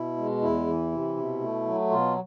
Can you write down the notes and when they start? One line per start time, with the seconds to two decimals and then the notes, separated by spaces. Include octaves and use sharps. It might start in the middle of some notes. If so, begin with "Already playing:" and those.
Already playing: B2 E4
0.17 G#3
0.42 E2 E4
0.67 E3
0.92 C3
1.16 B2
1.41 A3
1.66 F#3
1.90 B2 F4